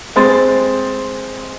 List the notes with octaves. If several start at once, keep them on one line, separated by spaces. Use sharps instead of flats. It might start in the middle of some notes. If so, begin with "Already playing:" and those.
G#3 C4 C6 A6